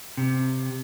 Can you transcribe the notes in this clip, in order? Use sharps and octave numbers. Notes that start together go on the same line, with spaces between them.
C3